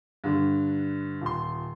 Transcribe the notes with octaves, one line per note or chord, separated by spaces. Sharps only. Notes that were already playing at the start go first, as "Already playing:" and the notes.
G2 D3
D#1 C6